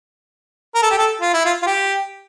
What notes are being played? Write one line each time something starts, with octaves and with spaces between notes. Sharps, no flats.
A#4
A4
G4
A4
F4
E4
F4
F4
G4